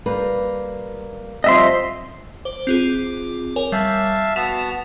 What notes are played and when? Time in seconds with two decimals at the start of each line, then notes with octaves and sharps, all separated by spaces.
0.06 G3 A#3 B4
1.44 F3 G3 C4 D#5 E5 C6
2.45 C5 D6
2.67 C4 F4 G#4
3.56 A#4 C#5 G#5
3.72 G3 E5 F5 A5
4.36 B3 F#4 A5 B6 E7 F7